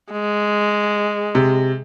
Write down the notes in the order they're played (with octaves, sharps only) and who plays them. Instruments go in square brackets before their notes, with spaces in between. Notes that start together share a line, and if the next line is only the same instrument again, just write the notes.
[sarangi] G#3
[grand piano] C3